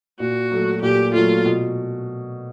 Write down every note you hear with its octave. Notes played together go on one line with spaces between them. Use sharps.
A#2 F#4
F#3 A3
A#2 G4
F#3 A3 F4
B2